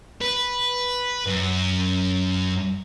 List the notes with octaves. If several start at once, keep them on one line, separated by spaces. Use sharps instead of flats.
B4
F#2